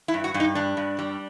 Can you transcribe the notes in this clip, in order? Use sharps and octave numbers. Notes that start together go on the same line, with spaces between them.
E4
G2
F#4
G2
D#4
G3 D4
G2
G3